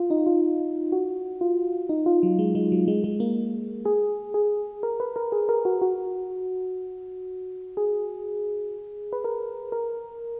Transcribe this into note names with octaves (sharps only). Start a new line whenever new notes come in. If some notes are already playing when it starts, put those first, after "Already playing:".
Already playing: F4
D#4
F4
F#4
F4
D#4
F4
F#3
G#3
G#3
F#3
G#3
G#3
A#3
G#4
G#4
A#4
B4
A#4
G#4
A#4
F#4
F#4
G#4
B4
A#4
A#4